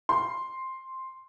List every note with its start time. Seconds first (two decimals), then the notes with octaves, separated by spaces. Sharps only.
0.09 C6